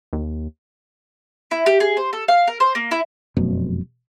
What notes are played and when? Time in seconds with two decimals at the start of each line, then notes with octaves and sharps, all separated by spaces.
0.13 D#2
1.51 E4
1.66 G4
1.80 G#4
1.97 C5
2.13 A4
2.28 F5
2.47 A#4
2.60 C5
2.75 A#3
2.91 E4
3.37 F1 F#2 B2